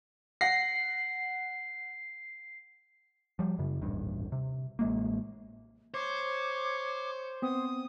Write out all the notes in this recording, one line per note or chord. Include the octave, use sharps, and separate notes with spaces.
F#5 A#6 C7
F3 G3
F#2 C#3
D#1 A1 G2
C3
A1 G#3 A#3
C5 C#5 D6
B3 C4 D#6